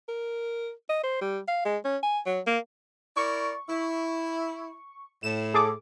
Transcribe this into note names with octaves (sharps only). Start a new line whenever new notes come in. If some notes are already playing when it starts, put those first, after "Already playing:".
A#4
D#5
C5
G3
F5
G#3
C#4
G#5
F#3
A#3
E4 A#4 D5 C#6
E4
A2 E7
G#4 A4 D6